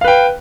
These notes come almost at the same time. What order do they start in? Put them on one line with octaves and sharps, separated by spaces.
F5 B4 G5